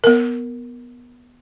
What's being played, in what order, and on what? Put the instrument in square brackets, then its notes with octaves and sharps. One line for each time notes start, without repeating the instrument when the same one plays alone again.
[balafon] B3 A#4